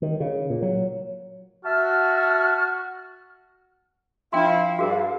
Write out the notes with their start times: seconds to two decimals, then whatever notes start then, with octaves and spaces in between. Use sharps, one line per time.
0.02 D#3
0.20 C#3
0.50 A#2
0.62 F#3
1.65 F#4 E5 A5 F6
4.33 F3 D4 E4 F5 G5 C6
4.79 G2 F#4 G#4 A#4